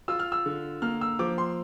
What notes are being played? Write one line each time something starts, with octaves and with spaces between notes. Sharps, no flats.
F4 E6
F6
E6
D3
A#3 F6
E6
F3 D6
C6